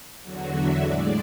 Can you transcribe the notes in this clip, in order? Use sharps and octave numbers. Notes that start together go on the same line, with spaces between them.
E2 D3 F#3 F#4
E5
A2 G#3 D5